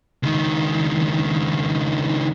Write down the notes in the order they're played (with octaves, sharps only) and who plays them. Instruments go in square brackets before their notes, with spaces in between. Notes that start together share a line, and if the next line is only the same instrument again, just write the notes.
[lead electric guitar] C#2 D#3